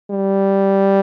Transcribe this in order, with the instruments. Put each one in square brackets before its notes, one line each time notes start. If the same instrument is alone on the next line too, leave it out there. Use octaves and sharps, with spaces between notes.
[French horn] G3